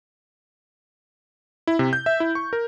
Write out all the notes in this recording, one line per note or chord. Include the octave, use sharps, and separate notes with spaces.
E4
C3
G6
E5
E4
C#6
A#4